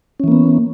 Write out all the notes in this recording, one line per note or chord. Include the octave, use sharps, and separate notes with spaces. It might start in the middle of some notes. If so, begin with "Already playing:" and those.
E3 A#3 B3 C#4